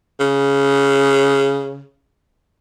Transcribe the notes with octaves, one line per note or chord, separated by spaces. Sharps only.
C#3